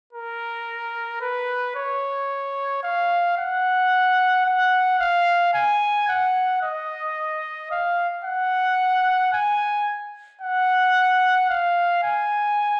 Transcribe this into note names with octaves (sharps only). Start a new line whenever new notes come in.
A#4
B4
C#5
F5
F#5
F#5
F5
G#5
F#5
D#5
F5
F#5
G#5
F#5
F5
G#5